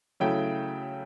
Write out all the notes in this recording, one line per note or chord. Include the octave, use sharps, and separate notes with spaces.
C#3 F#3 A3 E4 G5